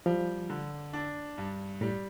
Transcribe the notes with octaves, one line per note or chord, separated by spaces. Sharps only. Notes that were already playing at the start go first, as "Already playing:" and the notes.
F3 G3
D3
D4
G2
A2 G3